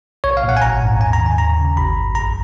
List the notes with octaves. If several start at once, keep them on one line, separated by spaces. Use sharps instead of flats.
B1 C#5
F5
A#2
F#5
G#5
G#1 A#5
G#2
D#2 G#5
A#5
D#3
G#5
D#2 A#5
C#3
G#1 B5
F#2
A#1 A#5